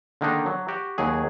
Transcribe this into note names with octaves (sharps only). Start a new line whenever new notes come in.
D3 D#3 A#3 D4 D#4
F#3
F#4 G4
D#2 F#3 G#4